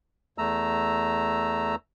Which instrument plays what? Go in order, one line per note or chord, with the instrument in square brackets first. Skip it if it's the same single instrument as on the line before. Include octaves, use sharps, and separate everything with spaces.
[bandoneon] E2 A3 A#5 E6